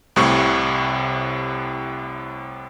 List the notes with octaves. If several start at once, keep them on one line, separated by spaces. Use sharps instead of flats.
C2 A2 C3 C#6